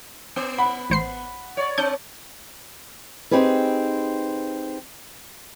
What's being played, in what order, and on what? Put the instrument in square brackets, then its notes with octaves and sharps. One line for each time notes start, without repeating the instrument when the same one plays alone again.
[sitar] B3
[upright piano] F#5 B5
[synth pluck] A1 C5 C7
[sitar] C#5 D5
[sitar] C4 [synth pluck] G6
[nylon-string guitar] C4 D#4 G4 G#4 B4